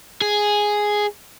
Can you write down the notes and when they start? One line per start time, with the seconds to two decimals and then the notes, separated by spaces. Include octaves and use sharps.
0.21 G#4